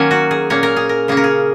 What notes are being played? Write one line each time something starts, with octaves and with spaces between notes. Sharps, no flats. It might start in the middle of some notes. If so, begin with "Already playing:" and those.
Already playing: D#3 F#3 A#3 C#4 G#5
F#4
G#4
A#2 A#3 C#4 C#5
A#4
G#4
A#4
C#3 A#3 C#4 G#4
A#4
G#4